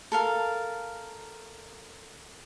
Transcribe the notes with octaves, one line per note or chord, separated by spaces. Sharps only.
A4 A#4 F5